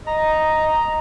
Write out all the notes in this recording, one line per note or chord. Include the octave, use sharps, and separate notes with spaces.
D#5 A#5